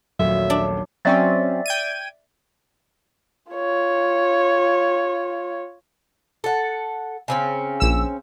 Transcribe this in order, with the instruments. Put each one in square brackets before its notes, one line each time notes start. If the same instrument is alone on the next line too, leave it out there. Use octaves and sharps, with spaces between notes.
[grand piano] A#1 D#2 A3 [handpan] F#3 [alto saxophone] E5
[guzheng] D4
[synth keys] F#3 C4 C#4 [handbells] D5 E5 A6
[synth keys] G5 G#6 D#7
[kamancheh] F4 C#5
[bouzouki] A4 F#5
C#3 C4 C#4
[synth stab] A#1 E6